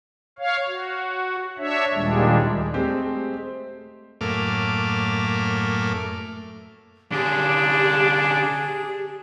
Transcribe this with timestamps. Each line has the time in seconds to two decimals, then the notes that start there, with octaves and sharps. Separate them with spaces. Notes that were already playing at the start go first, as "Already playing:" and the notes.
0.39 C#5 F5
0.68 F#4
1.58 D4 C#5 E5
1.94 D#2 A#2 G3 G#3 D4
2.74 G#3 A3 C4 G4 C5
4.21 F#2 A2 A3 A#3 D6 F6
7.12 D3 C#4 D4 G4 G#4